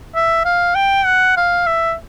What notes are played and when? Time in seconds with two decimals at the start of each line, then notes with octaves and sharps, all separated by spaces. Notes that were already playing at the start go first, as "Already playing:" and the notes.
0.15 E5
0.45 F5
0.75 G5
1.05 F#5
1.37 F5
1.66 E5